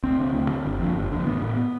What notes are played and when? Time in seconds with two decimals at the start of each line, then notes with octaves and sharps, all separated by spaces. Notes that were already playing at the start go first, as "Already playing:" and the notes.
0.04 D2 C4
0.19 D3
0.33 D2
0.49 D3
0.65 G1
0.80 F2 D3
0.95 G1
1.11 F2 D3
1.26 A1 B3
1.42 A2